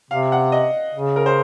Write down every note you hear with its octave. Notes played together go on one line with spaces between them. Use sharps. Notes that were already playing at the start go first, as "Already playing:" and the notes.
C3 F5
F#5
D#5
C#3
A#4
C5